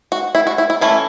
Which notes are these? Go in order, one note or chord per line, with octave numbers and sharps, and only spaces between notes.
F#4
E4
F#4
E4
E4
E3 A3 C#4 E4